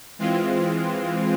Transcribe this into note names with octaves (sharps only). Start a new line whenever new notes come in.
E3 G#3 C4 F4